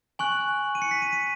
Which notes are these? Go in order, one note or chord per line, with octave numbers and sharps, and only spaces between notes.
G#5 C#6 F#6 F#7
D#7
C#7
B6
D#7
D#7